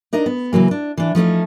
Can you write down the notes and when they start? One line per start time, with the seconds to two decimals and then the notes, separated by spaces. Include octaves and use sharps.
0.13 D4 D#4 A#4 D#5
0.26 B3
0.53 C#3 E3 F#3 A#3
0.71 D4
0.97 E3 D4
1.15 F3 A3 C#4 D#4